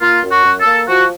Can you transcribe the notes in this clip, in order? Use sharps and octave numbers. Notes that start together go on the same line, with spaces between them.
A#3 F4
F#2
F#4
F#2
A4
A#3
F3 F#4